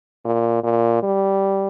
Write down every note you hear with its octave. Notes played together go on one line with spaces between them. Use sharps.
A#2
A#2
G3